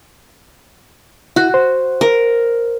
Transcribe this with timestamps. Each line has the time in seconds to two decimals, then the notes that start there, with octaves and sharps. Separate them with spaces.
1.36 E4 F#4 F#6
1.54 C5
2.01 A#4